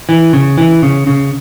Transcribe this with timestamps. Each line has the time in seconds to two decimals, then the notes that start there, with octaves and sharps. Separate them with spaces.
0.09 E3
0.33 C#3
0.58 E3
0.83 C#3
1.07 C#3